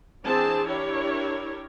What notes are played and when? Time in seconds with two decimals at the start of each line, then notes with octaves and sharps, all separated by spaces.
0.25 E3 C4 D4 G#4 C5 A5
0.67 D4 E4 G4 A#4 C#5